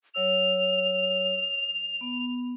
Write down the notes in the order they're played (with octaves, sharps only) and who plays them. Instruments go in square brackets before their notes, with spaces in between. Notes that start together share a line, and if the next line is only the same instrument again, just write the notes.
[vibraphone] F#3 C#5 E6 [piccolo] F7
[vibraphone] B3